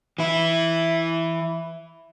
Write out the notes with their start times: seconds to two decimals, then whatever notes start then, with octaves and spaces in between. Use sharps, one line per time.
0.18 E3 E4